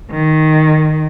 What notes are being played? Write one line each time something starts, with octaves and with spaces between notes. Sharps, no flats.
D#3